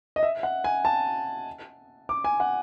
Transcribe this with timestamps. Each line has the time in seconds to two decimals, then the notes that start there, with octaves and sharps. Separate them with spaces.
0.16 D#5
0.23 E5
0.43 F#5
0.64 G#5
0.85 A5
2.09 D6
2.24 G#5
2.40 F#5